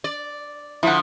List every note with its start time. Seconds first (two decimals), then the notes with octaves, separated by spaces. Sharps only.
0.04 D5
0.83 D3 F3 E4 F#5